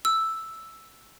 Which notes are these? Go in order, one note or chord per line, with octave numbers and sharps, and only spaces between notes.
E6